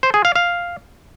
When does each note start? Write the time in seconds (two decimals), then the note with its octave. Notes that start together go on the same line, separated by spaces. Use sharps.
0.03 C5
0.14 G#4
0.25 F5
0.36 F5